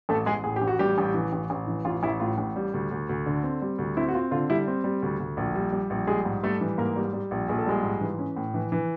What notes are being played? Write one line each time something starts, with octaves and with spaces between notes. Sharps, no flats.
A1 A3 A4
A1 G#3 G#4
A2 G#4
G4
A1
F#4
A1 G3 G4
A1
E3
A1
A1
E3
A1 F4
A1 E4
A2 F4
A1
G3
D2
D2
D2
D3
C4
G3
D2
C4 E4
F#4
C4 F4
D3 F4
G3 E4
C4
G3
D2
D2
A#1
G3
G3
A#1
G3 G#3 G#4
G#2
G3 A3 A4
E3
G#2 A#3 A#4
G3
G3
A#1
A#1 G#4
A4
G3 G#3 G#4
G#2
E3
C#4
A2
E3
E3